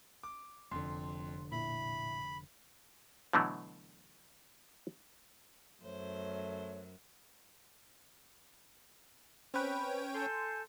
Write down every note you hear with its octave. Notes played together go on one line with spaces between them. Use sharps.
D6
F1 F2 D3 C6
A#2 E4 B5
B2 D3 E3 F#3 A3
F#2 A3 C5 C#5
C4 C#4 B4 C#5 G5
A4 G#5 C6 G6